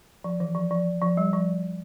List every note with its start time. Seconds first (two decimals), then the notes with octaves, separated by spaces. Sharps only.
0.24 F3
0.40 E3
0.55 F3
0.71 F3
1.02 F3
1.17 G3
1.33 F3